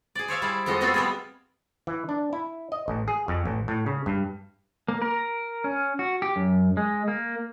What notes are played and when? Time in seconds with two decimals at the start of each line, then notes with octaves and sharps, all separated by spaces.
0.15 G#4 D5
0.28 C5 C#5 E5 F5
0.42 G3 E4 G#4 D5
0.66 F2 F3 G#3 F#4 D#5
0.81 A3 B3 C4 F4 F#4 A4
0.94 G3 B3 G#4
1.87 E3
2.09 D4
2.33 E4
2.72 D#5
2.88 A1
3.08 G#4
3.28 F2
3.46 A1
3.68 A2
3.86 C#3
4.06 G2
4.88 A#3
5.02 A#4
5.64 C#4
5.99 F#4
6.22 G4
6.36 F#2
6.77 G#3
7.08 A#3